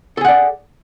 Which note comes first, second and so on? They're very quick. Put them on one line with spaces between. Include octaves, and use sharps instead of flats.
A4 G#4 F#5 D5